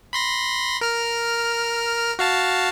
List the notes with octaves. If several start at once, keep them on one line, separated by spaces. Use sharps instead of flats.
B5 C6 A#6
A#4 F6
F#4 F5 A5